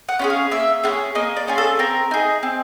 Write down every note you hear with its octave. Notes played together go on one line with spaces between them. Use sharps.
F#5
C#4 F4 G#4
F5
A#3 E5
C#4 F4 G#4
A#3 D#5
D5
C#4 F4 G#4
A4
C4 A#4
D#4 G#4
C4